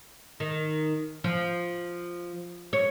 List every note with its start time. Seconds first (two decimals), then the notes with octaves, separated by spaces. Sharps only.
0.40 D#3
1.24 F3
2.73 C#5